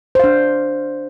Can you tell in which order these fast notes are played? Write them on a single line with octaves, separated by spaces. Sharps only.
C5 F5 D4